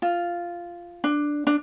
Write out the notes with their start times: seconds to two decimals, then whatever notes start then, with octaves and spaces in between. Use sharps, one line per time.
0.02 F4
1.04 D4
1.47 D4